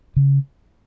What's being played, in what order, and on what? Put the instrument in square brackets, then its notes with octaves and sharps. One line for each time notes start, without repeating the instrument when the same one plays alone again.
[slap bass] C#3